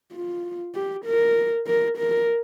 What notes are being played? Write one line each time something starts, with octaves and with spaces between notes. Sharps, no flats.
F4
G4
A#4
A#4
A#4